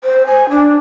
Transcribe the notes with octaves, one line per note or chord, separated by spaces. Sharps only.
C5
G#5
D4